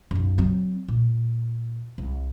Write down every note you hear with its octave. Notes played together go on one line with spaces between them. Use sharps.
B1 F#2
F#3 C4
A#2
C2